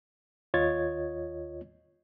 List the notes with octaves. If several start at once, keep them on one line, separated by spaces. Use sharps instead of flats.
D#2 F4 C#5 D#5 G#6 A6